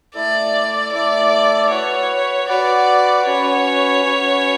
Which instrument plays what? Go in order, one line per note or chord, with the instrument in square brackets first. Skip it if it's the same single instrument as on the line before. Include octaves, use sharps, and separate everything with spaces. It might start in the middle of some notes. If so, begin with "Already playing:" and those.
[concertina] A3 E4 A4 [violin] D5
[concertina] A3 E4 A4 [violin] D5
[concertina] F#4 B4 F#5 [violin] C#5
[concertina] F#4 B4 F#5 [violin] D5
[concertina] C#4 F#4 B4 [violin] C#5
[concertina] C#4 F#4 B4